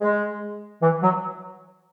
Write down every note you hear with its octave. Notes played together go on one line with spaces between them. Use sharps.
G#3
E3
F#3